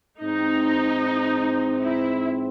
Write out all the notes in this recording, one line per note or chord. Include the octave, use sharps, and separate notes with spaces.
G#2 E3 C4 D#4
E4